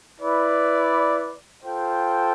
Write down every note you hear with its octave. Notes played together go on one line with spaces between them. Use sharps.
E4 B4 D5
F4 A4 C5 G5